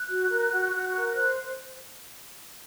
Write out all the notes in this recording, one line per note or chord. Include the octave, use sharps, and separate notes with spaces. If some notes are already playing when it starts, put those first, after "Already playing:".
Already playing: F#6
F#4
A#4
F#4
F#4
A#4
C5 F#6